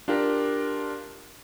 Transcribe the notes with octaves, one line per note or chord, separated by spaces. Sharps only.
D4 F4 G4 A#4